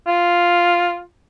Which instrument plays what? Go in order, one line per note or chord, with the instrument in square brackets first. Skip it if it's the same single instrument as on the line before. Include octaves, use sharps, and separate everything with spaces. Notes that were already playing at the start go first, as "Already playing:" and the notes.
[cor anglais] F4